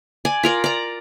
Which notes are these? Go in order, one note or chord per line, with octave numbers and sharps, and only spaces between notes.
D5 G#5
F4 A#4 D5
D5 A#5